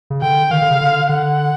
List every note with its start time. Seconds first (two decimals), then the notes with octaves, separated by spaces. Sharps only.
0.10 C#3
0.22 D3 G5
0.51 D#3 F5
0.62 D3
0.70 C#3
0.81 D3
1.09 D3 F#5